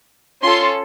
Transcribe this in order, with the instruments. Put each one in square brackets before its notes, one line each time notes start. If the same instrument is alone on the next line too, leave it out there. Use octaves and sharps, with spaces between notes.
[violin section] C#4 F4 A4 C6